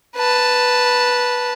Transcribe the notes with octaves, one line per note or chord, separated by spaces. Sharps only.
B4 A5